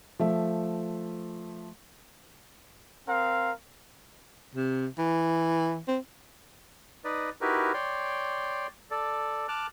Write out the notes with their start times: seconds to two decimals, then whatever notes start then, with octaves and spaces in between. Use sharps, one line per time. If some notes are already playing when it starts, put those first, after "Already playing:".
0.19 F3 A3 E5
3.08 C4 A#4 F5
4.55 C3
4.98 E3
5.88 C4
7.05 D#4 B4 D5 D#5
7.41 D#4 E4 F#4 G4 A#4 B4
7.74 C#5 D5 G5 C6
8.91 A4 D5
9.48 A5 D6 F6 F#6